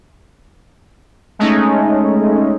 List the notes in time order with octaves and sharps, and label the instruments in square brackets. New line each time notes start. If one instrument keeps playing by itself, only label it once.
[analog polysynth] G#3 A3 C#4 D#4